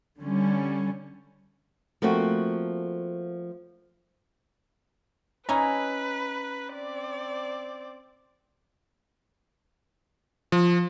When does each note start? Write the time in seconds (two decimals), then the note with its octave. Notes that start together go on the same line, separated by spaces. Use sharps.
0.18 D3 G3 C#4
2.02 F3 A3 A#3 C4 F#4
5.49 C#4 D#4 E4 B4 A#5
6.72 C4 D5
10.52 F3